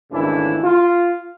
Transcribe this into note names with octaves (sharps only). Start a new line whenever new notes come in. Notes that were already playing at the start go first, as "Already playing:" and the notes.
G#1 C#3 E3 A3 D4 E4
F4